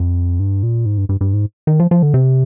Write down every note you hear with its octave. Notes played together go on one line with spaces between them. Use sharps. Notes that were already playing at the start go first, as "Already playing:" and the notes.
Already playing: F2
G2
A#2
G#2
G2
G2
G2
G#2
D#3
F3
F3
D3
C3